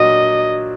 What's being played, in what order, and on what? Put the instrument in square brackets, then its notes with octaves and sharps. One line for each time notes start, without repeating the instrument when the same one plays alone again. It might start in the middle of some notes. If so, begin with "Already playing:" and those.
Already playing: [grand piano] A#2 F#3 D4 F#4 [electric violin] D#5